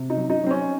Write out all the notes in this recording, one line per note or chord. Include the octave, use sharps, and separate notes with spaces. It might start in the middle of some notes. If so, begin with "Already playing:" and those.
Already playing: C3
D#4
F#3
D#4
F#3 C4
C#4